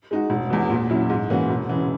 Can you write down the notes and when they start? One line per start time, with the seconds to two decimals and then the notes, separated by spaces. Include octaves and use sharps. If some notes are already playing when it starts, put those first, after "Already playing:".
0.11 G#3 D#4 F#4
0.30 E1
0.50 E2 B2
0.70 A#2
0.90 F#3 C#4 E4
1.10 G#2
1.30 E3 A#3 C#4 F#4
1.49 E1
1.69 C#3 E3